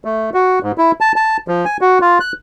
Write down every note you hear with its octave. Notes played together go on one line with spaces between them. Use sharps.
A3
F#4
G#2
E4
A5
A5
F3
G#5
F#4
F4
F#6